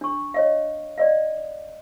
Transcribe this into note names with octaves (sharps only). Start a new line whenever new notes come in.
D4 C#6
C#5 D#5 F5
D5 D#5 F5